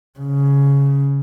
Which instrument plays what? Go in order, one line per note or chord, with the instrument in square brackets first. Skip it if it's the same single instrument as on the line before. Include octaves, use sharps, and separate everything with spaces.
[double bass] C#3